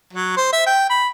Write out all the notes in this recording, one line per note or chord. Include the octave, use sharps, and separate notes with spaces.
F#3
C5
E5
G5
B5